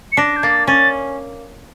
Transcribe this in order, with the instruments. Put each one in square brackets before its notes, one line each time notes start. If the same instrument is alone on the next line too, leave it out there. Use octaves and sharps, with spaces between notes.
[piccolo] C#7
[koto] D4 [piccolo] A#6
[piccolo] G6
[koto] A#3 [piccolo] A6
[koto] C#4 [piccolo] A6